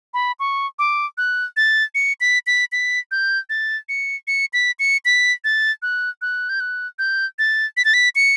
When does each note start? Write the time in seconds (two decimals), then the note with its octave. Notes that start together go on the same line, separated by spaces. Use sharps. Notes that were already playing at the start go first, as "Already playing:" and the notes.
0.14 B5
0.39 C#6
0.79 D6
1.18 F#6
1.57 A6
1.95 C#7
2.20 B6
2.47 B6
2.72 B6
3.11 G6
3.50 A6
3.89 C#7
4.27 C#7
4.53 B6
4.79 C#7
5.05 B6
5.44 A6
5.82 F#6
6.22 F#6
6.49 G6
6.60 F#6
6.99 G6
7.39 A6
7.77 B6
7.85 A6
7.94 B6
8.15 C#7